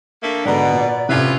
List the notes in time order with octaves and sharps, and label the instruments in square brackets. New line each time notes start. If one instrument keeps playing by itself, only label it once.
[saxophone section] D3 A3 A#3
[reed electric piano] G#2 D3 [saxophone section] B2 [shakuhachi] D5 [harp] F#5 A#5 B5
[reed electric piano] A#2
[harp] A2 C#4 E4 [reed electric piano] C3 G#6 [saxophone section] F4 G4 B4